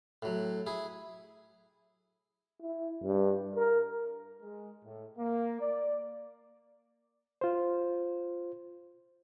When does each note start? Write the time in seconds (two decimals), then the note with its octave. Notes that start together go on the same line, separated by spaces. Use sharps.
0.22 A2 F#3
0.66 E4 G#4
2.62 E4
3.03 G2
3.56 A#4
4.42 G#3
4.84 A2
5.18 A#3
5.61 D5
7.41 F4 C5